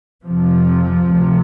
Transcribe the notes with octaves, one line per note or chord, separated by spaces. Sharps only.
F2 C3 F3
D2 C3